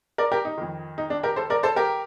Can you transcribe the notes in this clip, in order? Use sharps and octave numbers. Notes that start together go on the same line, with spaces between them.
A#4 D5
G4 A#4
D#4
F2 D#3
D#4
D4
G4 A#4
A4 C5
A#4 D5
A4 C5
G4 A#4